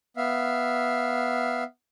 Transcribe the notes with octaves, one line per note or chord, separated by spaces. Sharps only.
B3 E5 F5